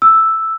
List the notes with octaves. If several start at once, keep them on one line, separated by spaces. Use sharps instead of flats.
E6